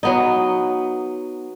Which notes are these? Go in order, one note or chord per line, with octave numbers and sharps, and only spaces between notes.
F#3 B3 D#4